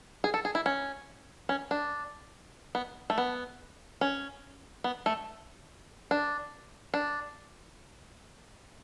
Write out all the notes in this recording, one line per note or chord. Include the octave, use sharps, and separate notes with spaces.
G#4
A4
G#4
E4
C#4
C#4
D4
B3
A3
B3
C#4
B3
A3
D4
D4